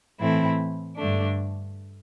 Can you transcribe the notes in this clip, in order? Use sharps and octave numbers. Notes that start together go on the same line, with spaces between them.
A2 E3 A3 C4 E4
G2 D3 A3 D4